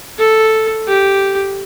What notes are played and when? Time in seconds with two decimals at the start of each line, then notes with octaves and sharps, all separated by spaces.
0.19 A4
0.88 G4